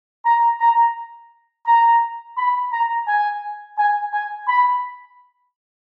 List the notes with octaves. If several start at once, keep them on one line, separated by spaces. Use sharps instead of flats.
A#5
A#5
A#5
B5
A#5
G#5
G#5
G#5
B5